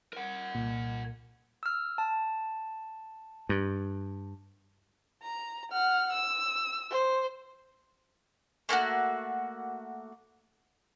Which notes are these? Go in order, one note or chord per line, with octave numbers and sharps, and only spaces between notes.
A#4 F#5
C2 A#2
E6 F6
A5
G2
A#5
F#5 F6
E6
C5
A3 A#3 F4 F#4